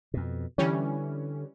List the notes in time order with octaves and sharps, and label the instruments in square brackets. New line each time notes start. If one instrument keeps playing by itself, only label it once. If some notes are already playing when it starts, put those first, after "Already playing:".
[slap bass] F2 B2
[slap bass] D3 [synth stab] E3 G3 C#4